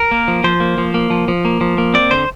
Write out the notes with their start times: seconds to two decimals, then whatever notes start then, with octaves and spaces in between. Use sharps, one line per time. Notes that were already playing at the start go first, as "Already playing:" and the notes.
Already playing: A#4
0.11 A#3
0.28 F3
0.44 F3 C5
0.60 A#3
0.78 F3
0.94 A#3
1.10 F3
1.28 F3
1.45 A#3
1.61 F3
1.78 A#3
1.94 C4 D5
2.11 D3 C5